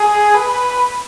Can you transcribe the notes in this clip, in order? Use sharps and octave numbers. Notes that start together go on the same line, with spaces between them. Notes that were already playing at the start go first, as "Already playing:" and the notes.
Already playing: G#4
B4